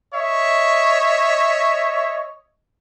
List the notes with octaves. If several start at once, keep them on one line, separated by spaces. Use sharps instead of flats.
C#5 D#5 E5